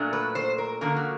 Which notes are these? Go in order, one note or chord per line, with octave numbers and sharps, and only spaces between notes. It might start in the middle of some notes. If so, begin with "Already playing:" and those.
Already playing: A#2 F#3 A3 D4
B4
C5
A#4
D3 F3 A#3 C#4 A#4
F#4